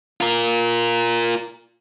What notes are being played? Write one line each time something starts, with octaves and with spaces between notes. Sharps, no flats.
F4 A#4